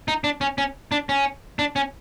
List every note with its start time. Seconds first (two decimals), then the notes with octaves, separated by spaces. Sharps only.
0.08 D#4
0.24 D4
0.41 C#4
0.58 C#4
0.92 D4
1.09 C#4
1.59 D4
1.76 C#4